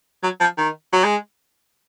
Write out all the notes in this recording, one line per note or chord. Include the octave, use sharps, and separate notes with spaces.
F#3
F3
D#3
F#3
G#3